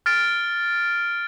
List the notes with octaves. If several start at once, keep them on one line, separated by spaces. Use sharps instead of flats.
F6 A6 D7